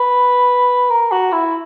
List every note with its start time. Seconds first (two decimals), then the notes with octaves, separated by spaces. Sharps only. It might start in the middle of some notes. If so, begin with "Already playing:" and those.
Already playing: B4
0.90 A#4
1.12 F#4
1.32 E4